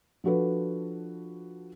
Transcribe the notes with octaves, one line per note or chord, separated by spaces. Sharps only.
F3 D4 F#4 A4 B4